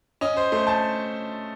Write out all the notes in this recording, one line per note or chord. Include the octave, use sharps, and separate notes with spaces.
C#4 D#5
C5
A3 C5
A5